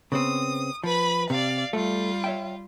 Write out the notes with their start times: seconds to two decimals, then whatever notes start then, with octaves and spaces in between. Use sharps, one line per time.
0.12 C#3 B3 C4 D#6
0.84 F3 B4 B5
1.30 C3 D5 F5
1.73 G3 A3 F4
2.24 C#5 E5 G5